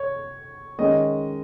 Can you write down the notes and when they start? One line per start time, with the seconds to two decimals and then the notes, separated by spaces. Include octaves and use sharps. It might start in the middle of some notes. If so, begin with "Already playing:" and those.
Already playing: C#5
0.78 D#3 G#3 C#4 D#5